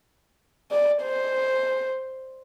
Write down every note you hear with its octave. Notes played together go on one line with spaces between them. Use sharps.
D5
C5